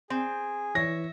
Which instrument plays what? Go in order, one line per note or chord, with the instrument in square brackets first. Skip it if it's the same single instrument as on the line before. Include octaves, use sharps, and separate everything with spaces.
[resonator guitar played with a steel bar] C4 [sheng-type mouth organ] G#4
[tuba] E3 [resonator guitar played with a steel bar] C#5 [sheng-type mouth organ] E5 [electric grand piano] A#6